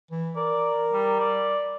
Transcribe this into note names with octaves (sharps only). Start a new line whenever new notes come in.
E3
A#4 D5
G3
D5